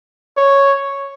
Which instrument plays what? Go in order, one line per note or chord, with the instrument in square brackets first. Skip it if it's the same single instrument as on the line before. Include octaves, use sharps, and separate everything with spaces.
[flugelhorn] C#5